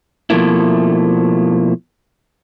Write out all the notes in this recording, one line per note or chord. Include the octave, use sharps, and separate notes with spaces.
B2 F3 A3 A#3 E4